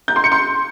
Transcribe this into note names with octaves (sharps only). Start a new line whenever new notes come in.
G6
C6
C#7
C6